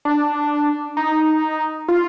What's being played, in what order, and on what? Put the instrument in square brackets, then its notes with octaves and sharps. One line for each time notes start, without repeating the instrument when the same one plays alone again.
[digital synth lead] D4
D#4
F4